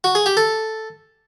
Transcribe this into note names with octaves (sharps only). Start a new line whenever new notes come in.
F#4
G#4
G4
A4